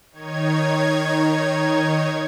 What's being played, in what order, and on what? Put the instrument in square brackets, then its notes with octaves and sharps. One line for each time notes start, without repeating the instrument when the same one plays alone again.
[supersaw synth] D#3 D#4 C#5 G#6